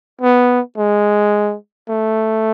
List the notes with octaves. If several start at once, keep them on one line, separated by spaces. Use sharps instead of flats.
B3
G#3
A3